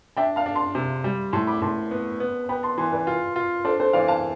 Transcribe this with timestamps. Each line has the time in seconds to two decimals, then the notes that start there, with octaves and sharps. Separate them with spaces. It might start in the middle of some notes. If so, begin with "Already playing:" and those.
0.17 D4 E5 G5
0.36 F5 A5
0.46 D4
0.55 A5 C6
0.75 C3
1.04 G3
1.33 A2 A5 C6
1.47 B5 D6
1.57 D6
1.62 A2 A5 C6
1.91 B3
2.20 B3
2.49 B3 G5 B5
2.63 A5 C6
2.78 E3 A5 C6
2.92 B4 D5
3.07 F4
3.36 F4
3.64 D4 A4 C5
3.79 A4 C5
3.93 E3 D5 F5
4.08 F5 A5